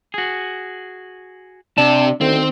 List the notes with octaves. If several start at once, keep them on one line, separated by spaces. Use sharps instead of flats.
F#4 G#4
C3 D4 A5
D2 D#3 C4